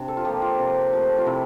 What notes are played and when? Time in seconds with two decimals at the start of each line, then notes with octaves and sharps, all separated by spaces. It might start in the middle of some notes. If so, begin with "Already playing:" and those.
Already playing: C3 D4
0.08 A4
0.17 F4
0.25 F3 A#3 G4
0.42 F4
0.59 C3
0.93 F3 A3
1.18 F4
1.26 C3 E4